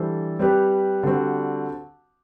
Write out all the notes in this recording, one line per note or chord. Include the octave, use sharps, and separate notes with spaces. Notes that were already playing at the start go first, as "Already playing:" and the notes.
Already playing: E3 G3 D4 A4 C5
G3 C4 G4 B4
D3 G3 C4 F#4